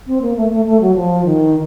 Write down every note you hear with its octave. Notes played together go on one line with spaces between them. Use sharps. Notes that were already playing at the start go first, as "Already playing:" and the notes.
C4
A#3
A3
A3
A3
F#3
F3
D#3